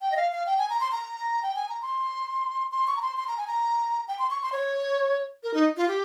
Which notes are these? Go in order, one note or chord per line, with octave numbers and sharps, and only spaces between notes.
G5
D#5
F5
F5
G5
G#5
A#5
C6
A#5
G5
G#5
A#5
C6
C6
C#6
A#5
C6
C6
A#5
G#5
A#5
G5
C6
C#6
C6
C#5
A#4
D#4
F4
G4